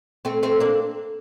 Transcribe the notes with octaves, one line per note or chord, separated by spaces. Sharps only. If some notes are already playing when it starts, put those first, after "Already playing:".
A3 C4
A3 C4
A#3 D4